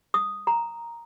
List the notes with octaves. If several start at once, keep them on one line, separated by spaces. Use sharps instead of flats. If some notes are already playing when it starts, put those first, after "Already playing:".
D#6
A#5